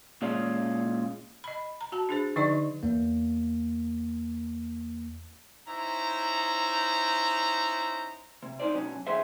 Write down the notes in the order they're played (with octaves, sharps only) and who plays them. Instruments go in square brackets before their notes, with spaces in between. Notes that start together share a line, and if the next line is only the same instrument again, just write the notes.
[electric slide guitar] A#2 G#3 C#4 F4
[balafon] D#5 B5
A#5
F#4 A5
D4 G#4 C5
D3 F3 D#4 D5 D#5 C#6
[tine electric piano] E2 A#3
[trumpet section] C#4 D#4 E4 C5 A#5
[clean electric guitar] C3
F#2 D#4 F#4 C5 D5
B2 F#3 C#4
B1 G2 E3 G#4 C5 E5